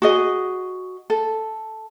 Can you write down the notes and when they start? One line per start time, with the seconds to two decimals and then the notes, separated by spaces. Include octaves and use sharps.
0.02 F#4 G#4 D#5
1.10 A4